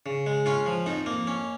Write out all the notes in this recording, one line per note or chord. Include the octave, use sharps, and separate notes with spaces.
C#3
G#3
C#4 F4
F3
F2 D#4
A#3
C#4